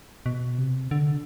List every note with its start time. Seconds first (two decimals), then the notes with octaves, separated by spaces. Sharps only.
0.26 B2
0.58 C3
0.91 D3